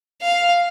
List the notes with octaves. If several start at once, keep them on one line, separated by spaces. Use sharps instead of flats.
F5